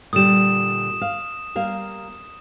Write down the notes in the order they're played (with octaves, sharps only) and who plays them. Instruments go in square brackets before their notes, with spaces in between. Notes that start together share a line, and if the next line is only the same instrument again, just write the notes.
[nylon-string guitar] A#2 D3 G3 [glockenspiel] D#6 E7
[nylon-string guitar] F5
G3 A#3 F5